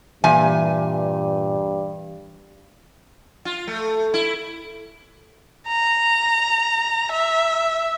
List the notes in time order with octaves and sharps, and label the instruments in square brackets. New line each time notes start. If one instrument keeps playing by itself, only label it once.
[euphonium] G2 [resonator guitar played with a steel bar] A#2 G#5 [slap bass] E3 [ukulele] E5
[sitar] F4
A3
E4
[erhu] A#5
E5